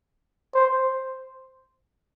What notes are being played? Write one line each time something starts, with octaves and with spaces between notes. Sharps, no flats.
C5